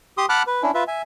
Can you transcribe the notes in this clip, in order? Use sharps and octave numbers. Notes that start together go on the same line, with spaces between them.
G4 C6 D#6
F#5 A5 B5 D6 F6 F#6
B4
C#4 D4 E4
F4 B4 E5
E5 G#5